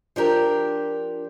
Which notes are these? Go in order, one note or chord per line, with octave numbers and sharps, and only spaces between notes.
F3 D4 G4 A#4